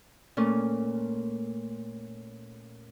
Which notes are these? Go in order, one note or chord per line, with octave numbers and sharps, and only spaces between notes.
A#2 A3 C#4